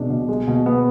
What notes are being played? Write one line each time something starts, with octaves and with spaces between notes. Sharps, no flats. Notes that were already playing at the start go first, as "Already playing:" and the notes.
Already playing: B2 G#3 D4
B2
G#3
B2
B3